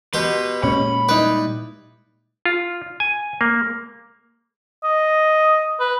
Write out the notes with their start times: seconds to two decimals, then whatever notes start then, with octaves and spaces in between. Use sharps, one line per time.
0.14 B2 G4 B4 C6
0.63 A#2 G#3 C#4 B5
1.09 G3 D#4 E4 B4
2.46 F4
3.00 G#5
3.41 A#3
4.84 D#5
5.80 B4